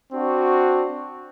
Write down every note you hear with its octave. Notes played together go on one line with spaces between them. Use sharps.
C4 D4 F#4